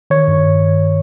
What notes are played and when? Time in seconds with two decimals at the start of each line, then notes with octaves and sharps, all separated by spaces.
0.10 D#3 C#5
0.28 G2